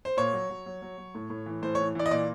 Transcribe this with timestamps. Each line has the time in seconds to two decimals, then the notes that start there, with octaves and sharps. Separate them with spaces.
0.05 C5
0.17 A#2 C#5
0.33 F#3
0.50 F#3
0.66 F#3
0.82 F#3
0.98 F#3
1.15 A2
1.30 A2
1.46 E3
1.63 A2 C5
1.75 E3 C#5
1.95 E3 D5
2.06 D#5
2.11 A#2 D5